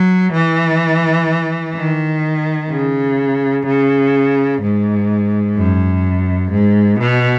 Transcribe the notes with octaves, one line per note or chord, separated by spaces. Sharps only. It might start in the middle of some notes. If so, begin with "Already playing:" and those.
Already playing: F#3
E3
D#3
C#3
C#3
G#2
F#2
G#2
B2